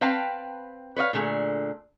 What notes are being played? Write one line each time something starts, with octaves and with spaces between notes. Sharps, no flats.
C4 B4 F5 G5 A5
B4 C#5 D#5 F5
A#2 D3 A3 G#4